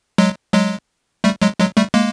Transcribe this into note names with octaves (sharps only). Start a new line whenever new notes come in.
F#3 G#3
F#3 G#3
G3 A3
F#3 G#3
F#3 G#3
G3 A3
G#3 A#3